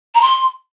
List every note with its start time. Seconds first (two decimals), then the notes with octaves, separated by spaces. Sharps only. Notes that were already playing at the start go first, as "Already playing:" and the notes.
0.15 A#5
0.22 C6